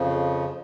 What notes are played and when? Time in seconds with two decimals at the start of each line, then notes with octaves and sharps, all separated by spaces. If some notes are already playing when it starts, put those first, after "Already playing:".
Already playing: F2 C#3 F3